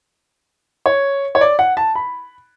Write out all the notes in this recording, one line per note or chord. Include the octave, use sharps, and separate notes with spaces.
C#5
C#5
D5
F#5
A5
B5